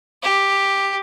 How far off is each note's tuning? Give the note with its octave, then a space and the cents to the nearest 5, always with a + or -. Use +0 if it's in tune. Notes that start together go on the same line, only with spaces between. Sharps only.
G4 +5